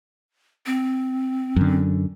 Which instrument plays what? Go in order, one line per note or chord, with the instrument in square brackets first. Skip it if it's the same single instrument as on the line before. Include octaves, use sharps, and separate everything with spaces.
[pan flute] C4
[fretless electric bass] F#2 D3